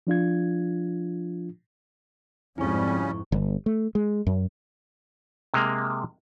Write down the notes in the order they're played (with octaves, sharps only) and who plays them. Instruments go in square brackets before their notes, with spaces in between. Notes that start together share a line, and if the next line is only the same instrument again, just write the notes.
[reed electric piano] F3 D4 F4 G#6
[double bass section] F2 G#2 [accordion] C#3 G3 C#4 [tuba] C4 [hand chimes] E4 C#6
[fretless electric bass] G1
A3
G#3
F#2
[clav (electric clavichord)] C3 G#3 A#3